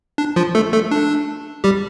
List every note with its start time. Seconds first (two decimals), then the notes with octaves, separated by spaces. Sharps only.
0.18 D4
0.36 F3 F4
0.55 A3 A4
0.73 A3 A4
0.91 D4
1.64 G3 G4